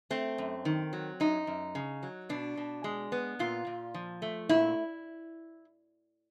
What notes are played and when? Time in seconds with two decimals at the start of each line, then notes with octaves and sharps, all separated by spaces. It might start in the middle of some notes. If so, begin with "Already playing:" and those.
0.10 A3 C4
0.38 F#2
0.65 D#3
0.93 F#3
1.20 F#2 D#4
1.47 F#2
1.75 C#3
2.03 F#3
2.29 B2 D4
2.57 B2
2.84 G#3
3.12 B3
3.39 A#2 F4
3.67 A#2
3.94 F3
4.22 A3
4.49 A#2 E4